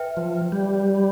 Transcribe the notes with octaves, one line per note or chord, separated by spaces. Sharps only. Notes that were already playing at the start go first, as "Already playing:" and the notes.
Already playing: B4 E5 G5
F3
G3